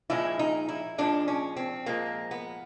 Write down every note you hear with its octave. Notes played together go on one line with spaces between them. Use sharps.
A#2 F3 G#3 E4
D#4
E4
A#2 F3 G#3 D4
C#4
C4
A#2 F3 G#3 A#3
B3